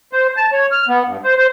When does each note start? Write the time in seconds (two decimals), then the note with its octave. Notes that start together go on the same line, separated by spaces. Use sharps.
0.13 C5
0.37 A5
0.52 C#5
0.72 F6
0.88 B3
1.06 G2
1.24 C5
1.38 C5